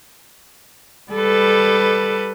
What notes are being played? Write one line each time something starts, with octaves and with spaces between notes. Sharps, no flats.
G3 A4 B4